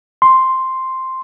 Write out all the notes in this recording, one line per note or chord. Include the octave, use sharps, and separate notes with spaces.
C6